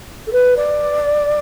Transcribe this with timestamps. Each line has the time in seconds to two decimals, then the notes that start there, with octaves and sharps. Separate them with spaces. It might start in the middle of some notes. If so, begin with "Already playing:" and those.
0.27 A4
0.32 B4
0.57 D5